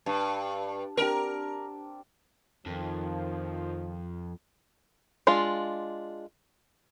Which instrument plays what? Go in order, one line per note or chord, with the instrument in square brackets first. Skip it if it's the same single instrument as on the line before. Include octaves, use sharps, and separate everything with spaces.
[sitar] G2 [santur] A5
[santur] C4 D4 G4 [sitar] A#4
[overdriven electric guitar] F2 [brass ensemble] D#3 F3
[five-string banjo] G#3 D4 F4